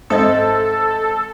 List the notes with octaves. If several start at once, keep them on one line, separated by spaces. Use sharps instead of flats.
G#2 C4 A4 D#5 E5 D#6